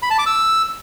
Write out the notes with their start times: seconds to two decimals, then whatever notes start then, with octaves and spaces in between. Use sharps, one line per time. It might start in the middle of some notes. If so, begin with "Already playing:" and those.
0.02 B5
0.10 A5
0.18 D6
0.26 E6